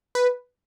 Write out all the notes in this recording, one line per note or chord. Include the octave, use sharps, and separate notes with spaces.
B4